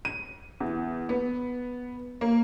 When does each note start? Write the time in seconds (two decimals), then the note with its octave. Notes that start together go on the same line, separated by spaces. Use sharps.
0.05 D#7
0.60 E2
1.09 B3
2.21 A#3